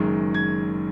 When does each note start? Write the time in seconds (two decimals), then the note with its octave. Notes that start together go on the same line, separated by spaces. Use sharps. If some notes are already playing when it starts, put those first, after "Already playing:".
Already playing: F#1 F#2 D#3 G#3
0.34 G#6